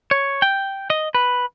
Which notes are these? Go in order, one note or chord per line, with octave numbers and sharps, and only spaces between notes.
C#5
G5
D#5
B4